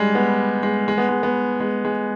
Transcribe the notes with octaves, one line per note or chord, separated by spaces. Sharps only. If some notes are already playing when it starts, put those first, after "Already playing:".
Already playing: G3 G#3
B3
G#3
G#3
B3
G#3
B3
G#3
G#3